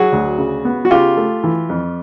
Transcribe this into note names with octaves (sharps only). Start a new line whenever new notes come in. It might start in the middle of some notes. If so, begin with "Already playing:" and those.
Already playing: F#3 F#4 G#4
D2
C#3
B3
F#4
C#3 F4 G4
A3
E3
F2